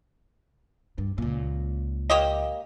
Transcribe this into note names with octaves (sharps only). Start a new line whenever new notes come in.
G2
C#2 A#2
A#3 G4 D#5